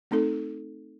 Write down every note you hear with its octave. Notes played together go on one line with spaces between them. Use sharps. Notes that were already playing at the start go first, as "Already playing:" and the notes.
A3 C4 D#4 A4